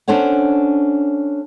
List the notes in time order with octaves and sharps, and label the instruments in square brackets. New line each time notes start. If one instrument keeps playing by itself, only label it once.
[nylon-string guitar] C#4 D4 A4 C5 C#5 F#5